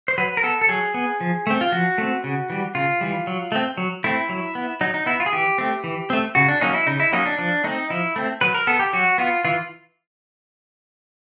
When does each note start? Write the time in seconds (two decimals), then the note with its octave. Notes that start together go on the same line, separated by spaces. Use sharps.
0.08 C5
0.18 F#3 B4
0.37 A#4
0.43 B3 A4
0.62 A4
0.69 F#3 G#4
0.94 B3
1.21 F3
1.47 A3 C4
1.61 F4
1.72 F3 F#4
1.98 A3 C4
2.24 C#3
2.50 E3 G3
2.75 C#3 F4
3.01 E3 G3
3.27 F#3
3.52 A3 C4
3.78 F#3
4.04 A3 C4 E4
4.29 F#3
4.55 B3
4.81 F#3 D#4
4.94 D#4
5.06 B3 E4
5.20 F4
5.26 G#4
5.33 E3 G4
5.58 A3 C4
5.84 E3
6.10 A3 C4
6.35 C#3 F#4
6.48 D4
6.61 F#3 A#3 C#4 D#4
6.74 E4
6.87 C#3 D#4
7.00 E4
7.12 F#3 A#3 C#4 D#4
7.26 D4
7.39 F3 D4
7.64 A3 C4 D#4
7.90 F3 E4
8.16 A3 C4
8.41 F#3 B4
8.54 A#4
8.67 B3 A4
8.80 G4
8.93 F#3 F#4
9.18 B3 F4
9.45 E3 F4